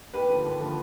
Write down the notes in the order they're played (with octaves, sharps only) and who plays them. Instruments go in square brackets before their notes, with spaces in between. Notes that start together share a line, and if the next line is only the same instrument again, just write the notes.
[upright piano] D#2 G4 B4
D3 F3
D#2
D3 F3